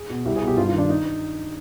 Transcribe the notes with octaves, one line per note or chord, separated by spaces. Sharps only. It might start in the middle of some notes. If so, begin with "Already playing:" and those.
Already playing: G#4
B2
C2 G4
G#4
B2
G4
G2 F4
F4
D#3
D4
D#4